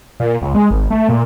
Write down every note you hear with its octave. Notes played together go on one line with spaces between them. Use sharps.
A#2
C#2
G#3
G#1
A3
A#2